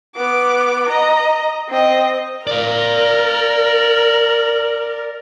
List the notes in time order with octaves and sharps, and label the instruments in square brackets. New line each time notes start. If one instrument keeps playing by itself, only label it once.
[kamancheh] B3 D6
D#5 A#5
C4 D#5
[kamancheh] A#4 [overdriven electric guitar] D5 F5